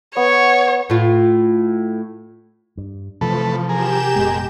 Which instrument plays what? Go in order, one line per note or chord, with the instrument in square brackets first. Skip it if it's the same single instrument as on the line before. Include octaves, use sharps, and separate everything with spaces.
[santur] B3 [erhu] C#5
[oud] A2 F4
[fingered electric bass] G2
[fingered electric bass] C3 E3 [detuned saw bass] F3 [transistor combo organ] A3 A4 B4
[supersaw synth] G4 G6 E7 [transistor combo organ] G#4 A#4
[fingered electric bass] F1 A#2 B3 [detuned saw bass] G#3